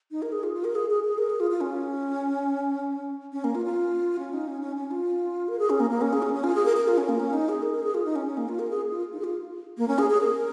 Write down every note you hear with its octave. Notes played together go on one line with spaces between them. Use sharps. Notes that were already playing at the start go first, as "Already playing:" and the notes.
D#4
A#4
G#4
F4
F4
A#4
G#4
G#4
G#4
A#4
G#4
F4
F4
C#4
C#4
A#3
F4
F4
C#4
D#4
C#4
C#4
C#4
F4
A#4
G#4
C#4
A#3
A#3
C#4
G#4
C#4
C#4
F4
G#4
A#4
A#4
F4
C#4
A#3
C#4
D#4
G#4
A#4
A#4
G#4
F4
D#4
C#4
C#4
A#3
F4
A#4
G#4
F4
D#4
G#4
F4
A#3
C#4
G#4
G#4
A#4